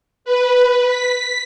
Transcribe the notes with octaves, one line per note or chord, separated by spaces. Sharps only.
B4
B6